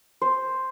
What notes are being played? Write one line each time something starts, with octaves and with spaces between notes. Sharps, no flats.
C5